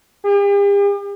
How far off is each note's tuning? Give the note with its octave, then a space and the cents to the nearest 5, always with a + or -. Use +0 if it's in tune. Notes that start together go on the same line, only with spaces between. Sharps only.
G4 +45